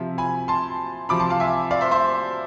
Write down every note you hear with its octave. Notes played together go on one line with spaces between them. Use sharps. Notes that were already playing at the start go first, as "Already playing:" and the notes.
Already playing: C3 F3 E5
G#5 B5
A5 C6
C3 F3 B5 D6
A5 C6
F5 A5
E5 G#5
D5 F5
C5 E5
C5 E5